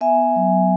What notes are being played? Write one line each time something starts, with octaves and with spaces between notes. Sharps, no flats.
B3 E5 G#5
F#3